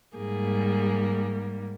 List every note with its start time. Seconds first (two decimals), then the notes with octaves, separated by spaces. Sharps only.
0.15 G#2 G3 A#3 G#4